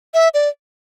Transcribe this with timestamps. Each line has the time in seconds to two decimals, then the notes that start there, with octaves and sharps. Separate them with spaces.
0.14 E5
0.34 D5